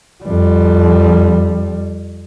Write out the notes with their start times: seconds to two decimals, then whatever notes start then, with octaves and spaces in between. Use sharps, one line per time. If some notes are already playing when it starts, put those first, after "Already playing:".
0.24 F2 G3